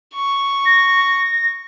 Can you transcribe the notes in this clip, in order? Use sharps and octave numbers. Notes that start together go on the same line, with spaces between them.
C#6
A#6